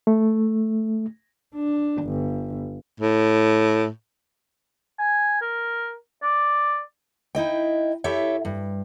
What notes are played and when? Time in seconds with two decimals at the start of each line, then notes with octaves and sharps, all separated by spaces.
0.07 A3
1.55 D4
2.04 G1
3.00 A2
4.99 G#5
5.42 A#4
6.23 D5
7.35 D#4 E4 D#5 G5
8.04 E4 G4 A4 C#5 E5
8.45 G2